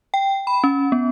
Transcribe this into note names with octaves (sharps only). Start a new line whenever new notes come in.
G5
B5
C#4
B3